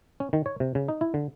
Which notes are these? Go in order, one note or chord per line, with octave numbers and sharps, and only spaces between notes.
C#4
D#3
C#5
C3
C#3
D#4
E4
D3